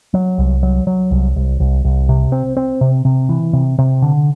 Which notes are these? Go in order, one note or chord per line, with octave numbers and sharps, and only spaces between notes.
F#3
C2
F#3
F#3
C2
C2
C2
C2
C3
C4
C4
C3
C3
E3
C3
C3
D3